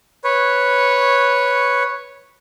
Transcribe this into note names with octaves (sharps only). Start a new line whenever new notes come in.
B4 C#5